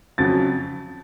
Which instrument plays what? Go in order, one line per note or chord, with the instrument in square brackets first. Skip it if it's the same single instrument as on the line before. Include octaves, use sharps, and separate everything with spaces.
[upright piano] F2 C#3 F#3 A6